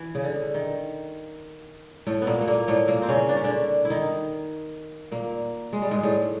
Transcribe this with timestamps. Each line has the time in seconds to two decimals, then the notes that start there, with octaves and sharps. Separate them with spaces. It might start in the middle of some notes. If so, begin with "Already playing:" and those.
Already playing: E3
0.15 C#3
0.23 D3
0.54 D#3
2.07 A2 A3
2.22 B3
2.27 A#2 A#3
2.41 A3
2.47 A#2 A#3
2.68 A2 A3
2.88 A#2 A#3
3.02 C4
3.08 C#3 C#4
3.29 D4
3.37 C#4
3.44 D3 D4
3.85 E4
3.90 D#3 D#4
5.12 A#2 A#3
5.73 G#3
5.82 G3
5.91 G#2 G#3
6.03 A2 A3